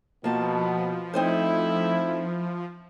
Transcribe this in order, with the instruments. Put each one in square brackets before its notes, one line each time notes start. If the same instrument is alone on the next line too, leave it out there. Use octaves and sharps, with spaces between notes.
[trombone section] B2 B3 [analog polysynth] F3 [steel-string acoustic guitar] A#3 A5
[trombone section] A3 E4 [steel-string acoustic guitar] C4 D#4 C5